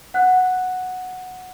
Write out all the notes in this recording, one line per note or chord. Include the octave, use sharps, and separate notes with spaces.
F#5 F#6